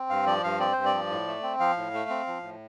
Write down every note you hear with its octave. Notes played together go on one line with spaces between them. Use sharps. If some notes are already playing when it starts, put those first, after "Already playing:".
Already playing: C4
G2 F5
F3 D5
G2 F5
C4 D5
G2 C5
D5
F3
A2
A3
C4
F3 F5
A2
A3
C4
F3
A2